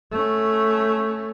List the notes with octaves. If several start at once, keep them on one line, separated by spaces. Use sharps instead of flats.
A3 C#4